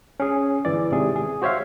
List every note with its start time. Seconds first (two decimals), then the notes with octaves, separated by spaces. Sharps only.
0.20 C#4 G#4
0.65 G1 E3 D5
0.91 G#1 G#2 C3 G#4
1.16 G#4
1.42 F#4 C5 C#5 E5 F5